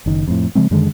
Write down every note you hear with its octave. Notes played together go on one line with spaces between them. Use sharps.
F#1 D#3
F2 A2
C#3 F3 G#3 C4
F#2 D3 D#3 G#3